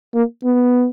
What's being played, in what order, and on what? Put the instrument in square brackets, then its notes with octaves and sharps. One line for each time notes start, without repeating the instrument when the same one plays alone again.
[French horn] A#3
B3